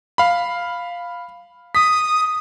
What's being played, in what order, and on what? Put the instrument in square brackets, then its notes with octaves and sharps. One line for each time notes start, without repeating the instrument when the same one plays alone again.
[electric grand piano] F5 B5
[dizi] D#6 [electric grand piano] B6